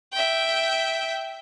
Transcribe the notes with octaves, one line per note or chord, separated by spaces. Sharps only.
E5 G5